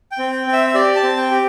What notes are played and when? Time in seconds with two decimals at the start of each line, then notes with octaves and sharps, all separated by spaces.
0.12 G5
0.18 C4
0.32 G5
0.47 C4
0.53 E5
0.67 E5
0.74 G4 D5
0.96 A5
1.03 C4
1.17 G5
1.31 G4